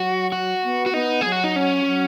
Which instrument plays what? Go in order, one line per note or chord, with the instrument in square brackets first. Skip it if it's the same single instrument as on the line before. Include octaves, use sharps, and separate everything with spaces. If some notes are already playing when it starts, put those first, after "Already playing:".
Already playing: [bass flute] F#3 [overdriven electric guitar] F#4
[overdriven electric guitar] F#4
[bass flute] B3
[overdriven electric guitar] F#4
[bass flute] B3 [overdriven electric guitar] D#4
[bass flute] F#3 [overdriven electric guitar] G#4
[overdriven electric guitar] F#4
D#4
C#4
[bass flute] F#3